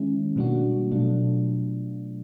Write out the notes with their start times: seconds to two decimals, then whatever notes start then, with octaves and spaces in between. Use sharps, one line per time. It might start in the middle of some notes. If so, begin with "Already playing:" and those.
Already playing: D#3 G#3 C#4 E4
0.36 B2 G3 A#3 D4 F#4
0.91 B2 F#3 A3 D4 F4